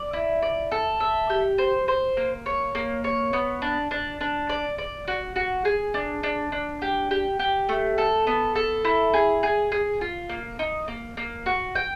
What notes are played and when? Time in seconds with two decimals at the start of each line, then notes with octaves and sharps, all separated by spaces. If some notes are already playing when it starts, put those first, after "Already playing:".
Already playing: D5
0.13 E4
0.42 D5
0.72 A4
1.00 E5
1.30 G4
1.58 C5
1.88 C5
2.17 A#3
2.46 C#5
2.75 A#3
3.04 C#5
3.33 B3
3.62 D4
3.91 D4
4.21 D4
4.49 D5
4.78 D5
5.08 F#4
5.36 F#4
5.65 G#4
5.94 D4
6.23 D4
6.52 D4
6.82 G4
7.11 G4
7.39 G4
7.69 A3
7.98 A4
8.27 B3
8.55 A4
8.85 E4
9.14 G#4
9.43 G#4
9.72 G#4
10.01 F4
10.29 A#3
10.59 D#4
10.88 A#3
11.17 A#3
11.46 F#4
11.75 G5